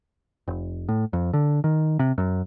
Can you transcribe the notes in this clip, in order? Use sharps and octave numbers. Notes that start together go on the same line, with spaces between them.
F1
A2
F2
D3
D#3
C3
F#2